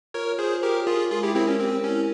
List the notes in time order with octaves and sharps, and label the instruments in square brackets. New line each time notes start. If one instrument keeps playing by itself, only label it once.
[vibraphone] F4 [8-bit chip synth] A#4 C#5
[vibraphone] F4 [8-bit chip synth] G#4 C5
[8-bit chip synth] G4 A#4 [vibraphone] C#5
[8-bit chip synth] F4 G#4 [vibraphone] A#4
[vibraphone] G#3 [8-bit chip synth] F4 G#4
[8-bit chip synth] E4 G4
[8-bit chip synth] C4 E4 [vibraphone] A#4
[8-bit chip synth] C#4
[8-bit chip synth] C4 [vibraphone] G4
[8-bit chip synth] C#4 [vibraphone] E4